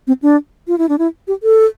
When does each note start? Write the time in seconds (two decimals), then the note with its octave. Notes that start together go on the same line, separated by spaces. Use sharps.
0.07 C4
0.22 D4
0.68 F4
0.78 E4
0.89 D4
0.98 E4
1.28 G4
1.43 A4